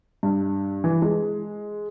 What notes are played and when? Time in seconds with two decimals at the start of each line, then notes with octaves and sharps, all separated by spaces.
0.23 G2
0.84 E3
1.02 G#3